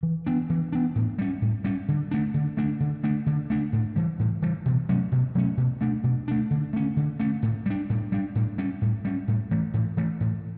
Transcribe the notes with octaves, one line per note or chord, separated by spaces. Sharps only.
E3
B3 D4
E3
B3 D4
A2
G3 C#4
A2
G3 C#4
D3
A3 D4
D3
A3 D4
D3
A3 D4
D3
A3 D4
A2
E3 G3
A2
E3 G3
B2
F#3 A3 C#4
B2
F#3 A3 C#4
B2
A3 D4
B2
A3 D4
D3
A3 C#4
D3
A3 C#4
A2
G3 D4
A2
G3 D4
A2
G3 C#4
A2
G3 C#4
A2
E3 A3
A2
E3 A3
A2